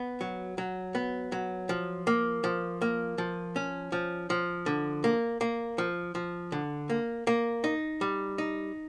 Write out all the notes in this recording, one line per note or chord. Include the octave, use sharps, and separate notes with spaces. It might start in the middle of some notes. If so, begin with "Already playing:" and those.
Already playing: B3
F#3
F#3
B3
F#3
F3
A#3
F3
A#3
F3
C#4
F3
F3
D3
A#3
A#3
F3
F3
D3
A#3
A#3
D#4
G3
D#4